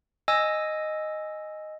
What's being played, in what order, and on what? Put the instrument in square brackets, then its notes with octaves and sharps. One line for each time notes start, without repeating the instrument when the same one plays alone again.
[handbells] D#5 G#5 E6